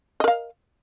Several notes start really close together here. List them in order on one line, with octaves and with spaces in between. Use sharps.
D#5 A#4 F5